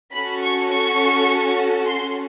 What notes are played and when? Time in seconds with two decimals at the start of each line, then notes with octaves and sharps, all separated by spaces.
0.12 C#4 F#4 A4 B5
0.41 C#6
0.70 C#6
1.86 C6